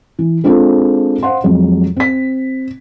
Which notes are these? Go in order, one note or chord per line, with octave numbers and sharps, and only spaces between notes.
E3
G#3 C4 D4 F4 G#4 A4
C5 F5 F#5 C6
F2 F#3 G#3
C4 B6